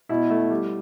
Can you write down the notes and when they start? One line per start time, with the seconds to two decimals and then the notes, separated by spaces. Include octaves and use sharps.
0.09 B2 E4
0.30 A3
0.50 G3